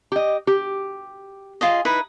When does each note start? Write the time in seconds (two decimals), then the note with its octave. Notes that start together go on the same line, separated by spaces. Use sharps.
0.12 G4 D#5
0.47 G4
1.61 F4 G#4 D#5
1.85 D#4 E4 B4